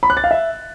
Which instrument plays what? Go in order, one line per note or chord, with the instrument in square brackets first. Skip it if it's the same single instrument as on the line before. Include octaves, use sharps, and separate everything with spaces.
[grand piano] B5
F#6
A6
F5
E5